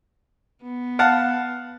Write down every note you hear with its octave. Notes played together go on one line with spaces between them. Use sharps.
B3
F5 F#5 A5